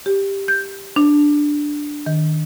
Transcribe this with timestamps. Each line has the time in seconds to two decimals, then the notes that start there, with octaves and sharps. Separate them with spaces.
0.06 G4
0.48 G6
0.96 D4
2.06 D#3